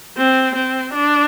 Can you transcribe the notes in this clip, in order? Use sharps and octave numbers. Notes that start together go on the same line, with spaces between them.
C4
C4
D4